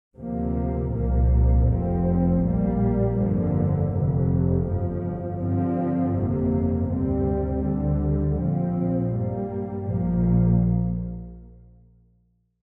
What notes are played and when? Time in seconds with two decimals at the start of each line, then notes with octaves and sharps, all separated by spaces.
0.17 D2 C3 F3 A#3
0.92 C2 A#2 F3 A#3
1.67 F1 F2 F3 C4
2.41 A#1 A#2 G3 A#3
3.16 G1 F2 D3 F3 A#3
3.91 F1 F2 C3
4.65 G1 F2 F3
5.40 G2 D3 F3 C4
6.15 G1 F2 C3 A#3
6.88 D2 C3 G3 C4
7.63 D2 D3 G3
8.38 A#1 A#2 F3 C4
9.13 G2 G3 A#3
9.87 A#1 A#2 F3 A#3